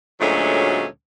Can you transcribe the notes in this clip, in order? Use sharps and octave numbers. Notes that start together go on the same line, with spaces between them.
D2 A#2 F#3 G#3 A3 C#4